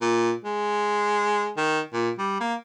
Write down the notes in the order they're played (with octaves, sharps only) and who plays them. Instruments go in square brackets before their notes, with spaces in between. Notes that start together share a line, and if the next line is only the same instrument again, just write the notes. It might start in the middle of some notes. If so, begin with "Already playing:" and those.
[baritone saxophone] A#2
G#3
D#3
A#2
G3
A#3